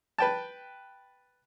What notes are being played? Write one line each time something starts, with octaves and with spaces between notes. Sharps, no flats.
B4 G5 A5